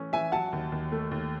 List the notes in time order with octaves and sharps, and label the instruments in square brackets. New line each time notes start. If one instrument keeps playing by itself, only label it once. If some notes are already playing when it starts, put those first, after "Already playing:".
Already playing: [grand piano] E3 A3 C#4
[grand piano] E3 [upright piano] E5 G#5
[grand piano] F#3 [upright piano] F#5 A5
[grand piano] D#2
D#2
A3
D#2